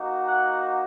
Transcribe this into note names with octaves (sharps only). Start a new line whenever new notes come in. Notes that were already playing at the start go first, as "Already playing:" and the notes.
Already playing: A#3 D#4 F#4
F#5